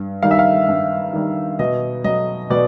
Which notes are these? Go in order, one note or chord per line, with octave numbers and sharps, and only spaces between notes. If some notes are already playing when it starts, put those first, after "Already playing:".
Already playing: G2
D#3 G3 F5
E5
F5
G2
D#3 G3
B2 D#5
F#3 D#5
B2 D5